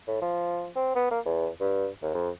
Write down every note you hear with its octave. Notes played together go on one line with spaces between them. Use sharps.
A2
F3
C4
B3
A#3
E2
G2
D#2
F2